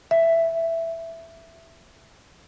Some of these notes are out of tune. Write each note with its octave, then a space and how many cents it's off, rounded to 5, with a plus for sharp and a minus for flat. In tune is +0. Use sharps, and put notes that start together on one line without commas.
E5 +5